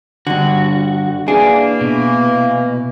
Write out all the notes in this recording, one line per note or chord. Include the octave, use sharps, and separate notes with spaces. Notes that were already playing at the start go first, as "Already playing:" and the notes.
G2 D3 F#4
E3 A#3 D4 G#4
B2